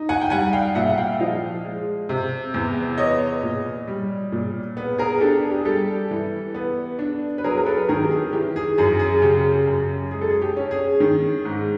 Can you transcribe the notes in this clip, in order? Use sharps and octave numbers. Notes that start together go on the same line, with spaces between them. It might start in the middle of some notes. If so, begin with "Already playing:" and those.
Already playing: D#4
F#5 G#5
G5
G3 F#5 G#5
F5 G5
A#2 E5 F#5
F#5
F5 G5
F3 D#5 F5
G#3
C3
E2
B3 C#5 D#5
A#2
G3
A#2
B3
G#4 A#4
D4 G4 A4
G#4
G4
G#4
G3 G4 A4
E3
B3
D4
B4
F#3 G#4 A#4
A#4
A4 B4
D#3 G#4 A#4
G4
G#4
E3 G4
G#4
F#2 G#4
G#4
C#3 G4
F#2
G#3 G#4
A4
G#4
G4
C#4
G#4
D#3
G#2